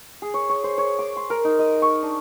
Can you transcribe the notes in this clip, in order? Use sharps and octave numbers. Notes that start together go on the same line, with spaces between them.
G#4
C#5
C#5
C5
C#5
D6
C6
A#4
D#4
D#5
C#6
D4